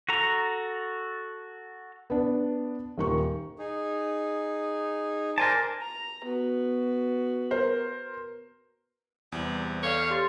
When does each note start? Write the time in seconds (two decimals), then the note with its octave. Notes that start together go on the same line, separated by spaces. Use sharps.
0.09 F#4 A4 A#5
2.10 B3 D4
2.98 D#1 D#3 C#6
3.59 D#4 G#4
5.38 A#4 C5 D5 G#5 A5 D6
5.81 A#5
6.24 B3 F#4
7.51 A#4 C5
9.32 E2 C3 G3
9.83 A4 C#5 D5 F5
10.10 G4 C6 A6